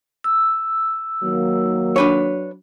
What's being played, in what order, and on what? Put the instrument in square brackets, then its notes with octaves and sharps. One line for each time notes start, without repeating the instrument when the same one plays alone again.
[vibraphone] E6
[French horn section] D#3 A#3 [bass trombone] F#3
[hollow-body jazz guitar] D4 B4 C#5